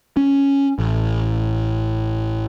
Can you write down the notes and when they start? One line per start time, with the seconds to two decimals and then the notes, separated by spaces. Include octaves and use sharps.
0.17 C#4
0.79 A1